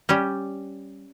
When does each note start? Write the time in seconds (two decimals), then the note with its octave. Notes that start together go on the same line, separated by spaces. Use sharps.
0.09 G3 C#4 G4